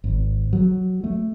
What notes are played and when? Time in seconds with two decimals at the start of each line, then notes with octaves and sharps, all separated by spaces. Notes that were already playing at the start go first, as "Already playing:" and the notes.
0.04 G#1
0.53 F#3
1.04 A3